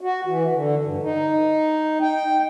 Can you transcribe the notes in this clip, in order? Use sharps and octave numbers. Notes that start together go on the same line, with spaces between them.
F#4
E3
D3
G2
D#4
G5